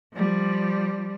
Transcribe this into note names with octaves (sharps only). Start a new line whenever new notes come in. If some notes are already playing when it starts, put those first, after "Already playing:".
F3 G3